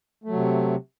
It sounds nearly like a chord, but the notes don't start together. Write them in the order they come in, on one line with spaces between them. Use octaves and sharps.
A3 F#3 C3